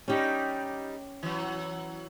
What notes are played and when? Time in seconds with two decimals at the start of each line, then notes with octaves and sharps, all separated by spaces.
0.08 G3 C#4 D#4 G4
1.23 E3 F#3